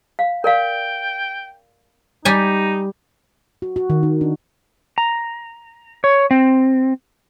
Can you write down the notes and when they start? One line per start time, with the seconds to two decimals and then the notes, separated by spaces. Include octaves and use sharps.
0.19 F5
0.44 A#4 D5 F5 G5
2.25 G3 D#4 G4 G#5
3.62 F#4
3.76 F#4
3.90 D#3
4.03 D#4
4.21 D4
4.98 A#5
6.04 C#5
6.31 C4